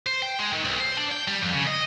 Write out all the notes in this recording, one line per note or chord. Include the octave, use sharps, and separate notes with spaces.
C5
G5
G#3
D#3
B1
C5
D4
G5
G3
F2
C#3
D#5